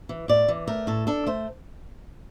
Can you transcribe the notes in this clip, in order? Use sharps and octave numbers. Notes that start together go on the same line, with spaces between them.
E3
A2 D5
E3
A3 A#4
A2 A4
D4 A4
A3 C5